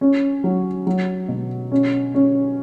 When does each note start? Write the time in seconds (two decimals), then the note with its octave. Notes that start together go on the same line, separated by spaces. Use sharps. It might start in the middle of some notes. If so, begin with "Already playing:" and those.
0.01 C#4
0.44 F#3
0.87 F#3
1.28 B2
1.72 C#4
2.14 C#4